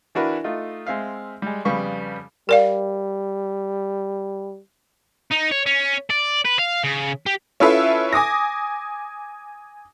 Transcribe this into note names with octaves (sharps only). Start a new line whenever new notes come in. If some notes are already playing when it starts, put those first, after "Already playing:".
E3 D4 E4 F#4 A#4 B4
A3 D#4 F4
G#3 C4 E5 F5
G3 G#3
F2 C#3 G3 B3 B5 C#6
G3 A#4 D5 F5
D#4
C#5
C#4
D5
B4
F5
C#3
G4
C#4 E4 F4 A4 B4 E5
G#5 D6 D#6 A#6